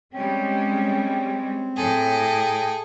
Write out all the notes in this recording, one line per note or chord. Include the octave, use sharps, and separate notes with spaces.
G3 G#3 C4 C#4 G5
A2 G#4 A4 G5